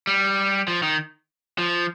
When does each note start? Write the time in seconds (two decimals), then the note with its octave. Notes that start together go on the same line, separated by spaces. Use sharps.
0.07 G3
0.68 F3
0.83 D#3
1.58 F3